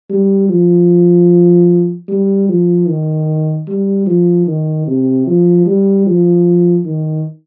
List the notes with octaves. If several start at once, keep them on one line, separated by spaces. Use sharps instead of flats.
G3
F3
G3
F3
D#3
G3
F3
D#3
C3
F3
G3
F3
D#3